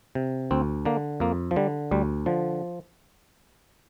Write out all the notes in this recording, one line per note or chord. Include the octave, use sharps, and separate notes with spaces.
C3
D2 C4
D3 A#3
F2 A#3
F3
D3 G3
D2 G3
D3 F3